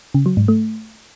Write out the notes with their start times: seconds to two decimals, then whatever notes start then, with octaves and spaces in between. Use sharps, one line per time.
0.14 C#3
0.26 F#3
0.37 G#2
0.48 A3